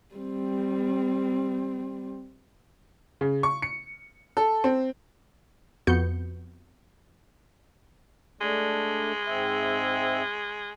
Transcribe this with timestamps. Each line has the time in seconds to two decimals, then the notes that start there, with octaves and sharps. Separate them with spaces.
0.15 G3 C4
3.21 C#3
3.43 C#6
3.62 C#7
4.37 A4
4.64 C4
5.87 F2 B3 F#4 G6 C#7
8.41 G#3 A3 D4
9.27 G#2 C4 E5